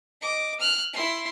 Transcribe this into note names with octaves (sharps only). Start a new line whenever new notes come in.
D#5 D6
F6 F#6
E4 C6